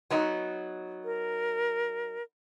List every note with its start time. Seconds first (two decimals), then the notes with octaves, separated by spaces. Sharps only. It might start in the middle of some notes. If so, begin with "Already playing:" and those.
0.10 F#3 B3 D#4
1.04 A#4